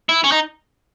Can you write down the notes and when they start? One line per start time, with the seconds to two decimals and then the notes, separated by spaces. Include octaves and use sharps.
0.09 E4
0.24 C#4
0.32 D#4